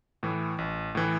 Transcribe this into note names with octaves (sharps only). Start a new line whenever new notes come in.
A2 E3
A1
A2 E3